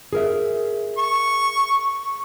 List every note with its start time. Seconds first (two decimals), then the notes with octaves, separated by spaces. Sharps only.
0.13 G#4 A#4 E5
0.98 C#6